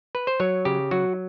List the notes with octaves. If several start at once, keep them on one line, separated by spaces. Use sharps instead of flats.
B4
C5
F#3 C#5
C#3 G4
F#3 F#4